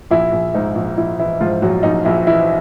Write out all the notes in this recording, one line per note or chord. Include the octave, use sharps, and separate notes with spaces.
A#1 E4
A#1
G#2 D#4
A#1
A#1 E4
E3 E4
G#2 F3 F4
A#1 F#3 F#4
A#1 D#4
A#1 E4
E3 E4